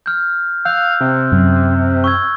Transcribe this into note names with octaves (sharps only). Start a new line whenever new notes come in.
F6 G6
F5 E6 F#6 G6
C3
F#2
C#6 E6 G#6